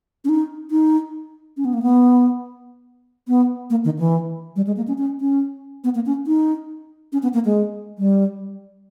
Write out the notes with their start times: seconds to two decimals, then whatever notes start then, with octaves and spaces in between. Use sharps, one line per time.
0.25 C#4
0.29 D#4
0.71 D#4
1.57 C#4
1.65 B3
1.74 A#3
1.82 B3
3.28 B3
3.70 A#3
3.85 D#3
3.99 E3
4.56 G3
4.67 G#3
4.77 A#3
4.88 C#4
4.98 C#4
5.21 C#4
5.84 B3
5.95 A#3
6.06 C#4
6.27 D#4
7.13 C#4
7.23 B3
7.34 A#3
7.45 G#3
7.98 G3